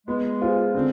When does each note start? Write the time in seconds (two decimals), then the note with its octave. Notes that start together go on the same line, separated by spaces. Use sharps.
0.07 G#3 B3
0.41 F4 G#4 C5
0.74 D3 C4